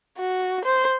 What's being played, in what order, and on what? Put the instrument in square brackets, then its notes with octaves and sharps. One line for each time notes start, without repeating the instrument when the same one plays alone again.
[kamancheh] F#4
C5